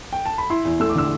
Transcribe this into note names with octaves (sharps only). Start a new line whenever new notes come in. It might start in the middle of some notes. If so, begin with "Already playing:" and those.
G5
A5
B5
E4 C6
E2
A3 E6
D6
D3 E6